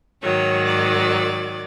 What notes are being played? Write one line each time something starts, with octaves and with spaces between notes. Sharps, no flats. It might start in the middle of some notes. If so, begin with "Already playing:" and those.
G#2 D#3 F#3 C#5
D5